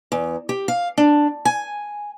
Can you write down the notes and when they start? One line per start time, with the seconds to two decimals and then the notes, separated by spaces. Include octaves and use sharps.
0.12 E2
0.49 G4
0.68 F5
0.98 D4
1.45 G#5